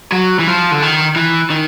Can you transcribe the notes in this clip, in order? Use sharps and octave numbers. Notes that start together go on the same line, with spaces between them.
F#3
E3
F3
D3
D#3
E3
D#3